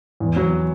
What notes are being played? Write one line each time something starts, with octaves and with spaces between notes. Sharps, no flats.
E2
F#3